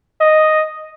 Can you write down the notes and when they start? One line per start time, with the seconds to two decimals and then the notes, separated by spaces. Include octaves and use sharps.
0.21 D#5